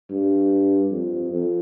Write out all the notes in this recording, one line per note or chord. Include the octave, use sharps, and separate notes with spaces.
G2
F2
F2